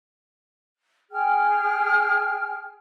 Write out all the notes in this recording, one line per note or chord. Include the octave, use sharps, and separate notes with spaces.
G#4 G5 F6